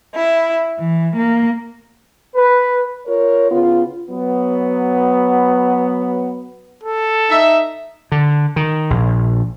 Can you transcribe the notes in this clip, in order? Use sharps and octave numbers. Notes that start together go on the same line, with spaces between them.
E4
E3
A#3
B4
F4 A#4 C#5
C#3 B3 F4
F#3 B3
A4
D#4 E5
D3
D#3
A#1